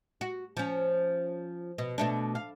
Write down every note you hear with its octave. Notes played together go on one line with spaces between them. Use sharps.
F#4
F3 C#4
B2
B2 A3 D4
F5